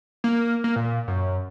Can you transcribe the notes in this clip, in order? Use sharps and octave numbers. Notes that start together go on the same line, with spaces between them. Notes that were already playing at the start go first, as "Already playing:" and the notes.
A#3
A#3
A#2
F#2